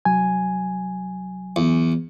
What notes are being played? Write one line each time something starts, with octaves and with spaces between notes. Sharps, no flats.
C2 F#3 G#5
E2